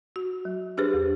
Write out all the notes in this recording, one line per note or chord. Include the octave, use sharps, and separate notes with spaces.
F#4
F#3
D4 G4 G#4 B4 C5
E2